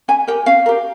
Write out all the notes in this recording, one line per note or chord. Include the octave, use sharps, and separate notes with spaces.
C#4 G#5
G4 A#4 G5
C#4 F5
G4 A#4